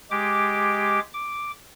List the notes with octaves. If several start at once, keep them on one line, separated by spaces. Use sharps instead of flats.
G#3 G4 D6
D6